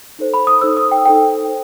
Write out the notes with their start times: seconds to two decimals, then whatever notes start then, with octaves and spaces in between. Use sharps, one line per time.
0.19 D#4 A4 C5
0.34 B5
0.47 D#6
0.61 D#4 A4 C5 E6
0.77 D#6
0.91 G5
1.06 D#4 A4 C5 G5
1.48 C5